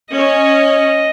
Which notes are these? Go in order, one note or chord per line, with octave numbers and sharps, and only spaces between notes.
C#4 D#5